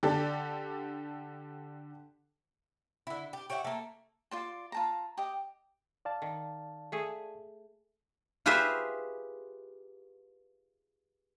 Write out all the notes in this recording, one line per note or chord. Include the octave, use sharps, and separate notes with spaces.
D3 G4 A4 D5
D3 E4
G4
G4 C#5 E5 F#5
A3 A#3
F4 D5 C6
F4 A5 A#5
G4 D#5
D5 F5 A5
D#3
A3 G#4
F4 G4 G#4 B4 C5 E5